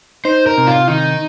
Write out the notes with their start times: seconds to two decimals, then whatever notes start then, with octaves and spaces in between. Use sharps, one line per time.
0.25 D#4 C5
0.47 A#4
0.57 C3
0.67 F4
0.88 D#3 D#4